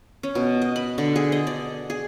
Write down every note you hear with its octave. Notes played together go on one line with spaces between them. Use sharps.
C#4
B2
D#5
B5
D3
G#4
D#5
D5
G#4